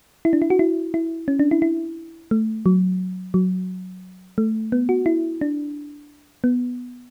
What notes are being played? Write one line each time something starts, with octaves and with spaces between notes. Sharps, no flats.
E4
D4
E4
F#4
E4
E4
C#4
D4
E4
E4
A3
F#3
F#3
A3
B3
F#4
E4
D4
B3